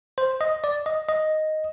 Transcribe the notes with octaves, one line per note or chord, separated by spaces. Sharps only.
C5
D#5
D5
D#5
D#5